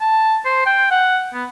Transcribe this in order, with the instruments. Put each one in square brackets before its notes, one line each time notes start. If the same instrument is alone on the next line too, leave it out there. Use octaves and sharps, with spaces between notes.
[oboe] A5
C5
G5
F#5
B3